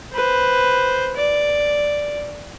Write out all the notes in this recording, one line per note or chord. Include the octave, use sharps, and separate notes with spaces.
B4 C5
D5